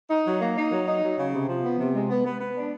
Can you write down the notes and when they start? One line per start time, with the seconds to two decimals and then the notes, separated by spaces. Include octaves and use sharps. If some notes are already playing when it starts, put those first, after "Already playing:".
0.10 D#4
0.25 F#3
0.40 A#3
0.56 D#4
0.71 F#3
0.87 D#4
1.01 F#3
1.17 C#3
1.33 C3
1.48 F3
1.63 B3
1.78 C3
1.94 G#3
2.08 B3
2.24 B3
2.39 B3
2.55 D4